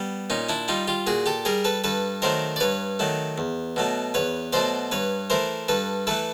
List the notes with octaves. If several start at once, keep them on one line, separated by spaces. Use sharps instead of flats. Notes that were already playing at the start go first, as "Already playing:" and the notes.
Already playing: G3 B3
A#2 C#4 D#4
D4 E4
G3 D#4 F4
F4 G4
A#2 F#4 G#4
G4 A4
G3 G#4 A#4
A4 B4
G2 A4 B4
D#3 F#3 A3 A#4 C5
D5
G2 B4 C#5
D#3 F#3 A3
E2
B2 F#3 A3
E2 B4 C#5
B2 F#3 A3 C5 D5
G2 B4 C#5
E3 A3 A#4 C5
G2 A4 B4
E3 A3 A4 B4